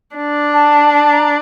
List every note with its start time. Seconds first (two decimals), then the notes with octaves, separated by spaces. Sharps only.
0.16 D4
0.54 A5
0.94 A5
1.13 A#5